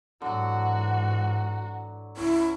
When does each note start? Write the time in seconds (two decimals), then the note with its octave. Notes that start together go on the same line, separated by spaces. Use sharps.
0.22 G#2 D3 E3 F#3 F#4
2.17 C#2 C#4 E4